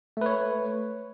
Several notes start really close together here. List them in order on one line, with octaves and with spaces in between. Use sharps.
A3 B4 C#5